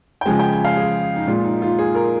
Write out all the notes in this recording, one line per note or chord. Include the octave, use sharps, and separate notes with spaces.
G5
C#3 F3 G#3 G#5
G5
G#5
F5
G#4
D#4
A#2 G#3 F4
D#4
F4
G#4
A#4